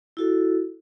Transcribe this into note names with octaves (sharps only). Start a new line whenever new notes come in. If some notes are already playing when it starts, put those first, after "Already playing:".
E4 F#4 A4